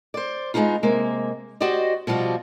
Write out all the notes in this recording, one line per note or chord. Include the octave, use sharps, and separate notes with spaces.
C5 D5
G#3 A3 B3 D#4 F4
C3 G#3 A#3
F#4 G4 C5 D5 D#5
B2 F3 G3 F4 F#4